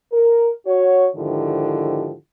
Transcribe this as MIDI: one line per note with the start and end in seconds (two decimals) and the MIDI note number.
0.12 0.51 70
0.67 1.07 66
0.67 1.07 73
1.15 2.13 44
1.15 2.13 50
1.15 2.13 51
1.15 2.13 53
1.15 2.13 64
1.15 2.13 67